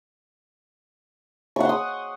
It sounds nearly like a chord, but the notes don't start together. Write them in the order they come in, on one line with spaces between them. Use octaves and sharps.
C#6 F#5 C6 D#6